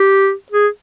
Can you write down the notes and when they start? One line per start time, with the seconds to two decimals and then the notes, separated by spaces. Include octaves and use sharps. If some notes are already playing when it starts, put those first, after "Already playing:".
Already playing: G4
0.52 G#4